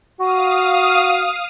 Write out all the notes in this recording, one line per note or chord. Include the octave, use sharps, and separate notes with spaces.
F#4 F5 D#6 D#7